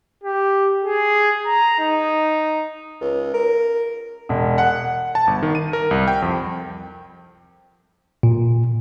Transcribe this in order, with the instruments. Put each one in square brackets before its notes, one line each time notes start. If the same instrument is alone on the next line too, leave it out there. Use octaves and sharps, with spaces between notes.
[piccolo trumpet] G4
G#4
A#5
D#4
[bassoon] C#2
A#4
[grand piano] E1
F#5
[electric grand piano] A5
G1
D#3
D#7
A#4
C2
G5
F2
[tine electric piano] A#2